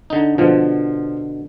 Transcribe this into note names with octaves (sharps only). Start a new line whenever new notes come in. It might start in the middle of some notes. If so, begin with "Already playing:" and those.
D3 D#4
B2 D3 F3